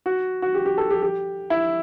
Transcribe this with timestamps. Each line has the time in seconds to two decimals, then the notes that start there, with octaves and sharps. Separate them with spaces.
0.06 F#4
0.42 F#4
0.55 G4
0.66 G4
0.78 A4
0.90 G4
1.02 G4
1.50 E4